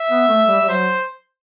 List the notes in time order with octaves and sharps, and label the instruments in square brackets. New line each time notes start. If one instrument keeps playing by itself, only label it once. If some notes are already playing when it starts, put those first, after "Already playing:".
Already playing: [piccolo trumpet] E5
[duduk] B3
A3
G3
G3
[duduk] F#3 [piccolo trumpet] C5